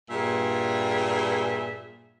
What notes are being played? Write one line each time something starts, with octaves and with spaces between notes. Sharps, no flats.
G2 A#2 G#4 E5